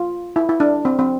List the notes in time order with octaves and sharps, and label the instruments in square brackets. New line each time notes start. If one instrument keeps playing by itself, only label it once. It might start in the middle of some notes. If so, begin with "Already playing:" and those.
Already playing: [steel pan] F4
E4
E4
D4
C4
C4